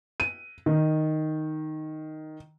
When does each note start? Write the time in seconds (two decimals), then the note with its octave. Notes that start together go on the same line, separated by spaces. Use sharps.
0.20 D#7
0.66 D#3